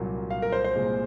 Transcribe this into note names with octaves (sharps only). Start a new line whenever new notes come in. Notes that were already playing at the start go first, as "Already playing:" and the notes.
Already playing: C2 A#2 F#3 A#3
F5
A#4
C5
C5
C2 A#2 G#3